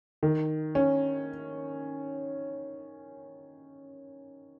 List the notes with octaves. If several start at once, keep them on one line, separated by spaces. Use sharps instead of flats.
D#3
C#4